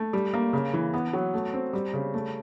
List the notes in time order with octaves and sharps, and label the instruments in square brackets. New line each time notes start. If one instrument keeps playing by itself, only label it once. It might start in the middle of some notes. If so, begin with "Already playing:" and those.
Already playing: [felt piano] A3
G3
A#3
C#3
E3
B3
F#3
A3
C4
G3
C#3
A3